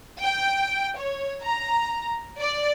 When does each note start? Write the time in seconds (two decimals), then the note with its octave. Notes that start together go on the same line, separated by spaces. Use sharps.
0.22 G5
0.98 C#5
1.43 A#5
2.40 D5